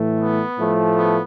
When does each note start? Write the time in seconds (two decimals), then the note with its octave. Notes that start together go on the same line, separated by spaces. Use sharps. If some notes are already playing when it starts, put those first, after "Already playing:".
Already playing: A2 E3 A3
0.20 B3
0.59 A2 F3 A3
0.96 B3